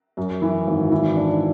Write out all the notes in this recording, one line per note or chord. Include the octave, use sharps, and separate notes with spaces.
F#2
E3
G#1
E3
D4